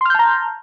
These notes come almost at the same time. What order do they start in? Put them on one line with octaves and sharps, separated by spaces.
C6 F6 G6 A5 A#5